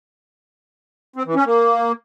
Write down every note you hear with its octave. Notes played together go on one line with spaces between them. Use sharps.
C4
E3
C#4
A#3